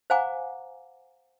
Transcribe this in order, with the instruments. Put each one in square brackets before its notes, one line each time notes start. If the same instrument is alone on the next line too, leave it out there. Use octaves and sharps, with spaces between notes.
[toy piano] C5 F5 F#5 G#5 A#5 D6